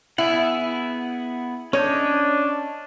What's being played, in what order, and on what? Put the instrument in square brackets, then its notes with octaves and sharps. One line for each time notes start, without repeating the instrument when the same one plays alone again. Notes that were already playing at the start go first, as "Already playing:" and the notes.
[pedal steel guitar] B3 G#4 F#5 [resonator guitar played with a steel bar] E4
[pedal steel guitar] C#4 D#5 G6 [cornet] D4 [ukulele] C#5